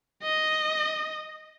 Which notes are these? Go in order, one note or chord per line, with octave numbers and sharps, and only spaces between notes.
D#5